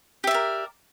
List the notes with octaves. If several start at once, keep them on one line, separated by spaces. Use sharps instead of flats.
G4 A#4 D5 E5